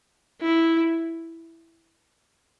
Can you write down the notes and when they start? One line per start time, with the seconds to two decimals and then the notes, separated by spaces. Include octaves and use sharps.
0.41 E4